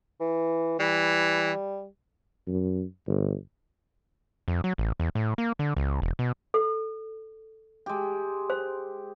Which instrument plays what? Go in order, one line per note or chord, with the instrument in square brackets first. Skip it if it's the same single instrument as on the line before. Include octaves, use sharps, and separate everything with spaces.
[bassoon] E3
[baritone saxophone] E3 [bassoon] G3
[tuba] F#2
G1
[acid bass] F2
F#3
A1
E2
A2
A#3
D3
C#2
E1
B2
[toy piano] A4
[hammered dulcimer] G#3 G4
[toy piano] C5